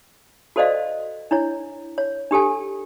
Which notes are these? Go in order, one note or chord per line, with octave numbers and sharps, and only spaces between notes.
F#4 A4 C5 D5 D#5 F5
D4 E4 C#5
C#5
D4 G4 A4 G#5